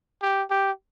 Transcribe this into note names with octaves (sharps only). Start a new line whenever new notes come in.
G4
G4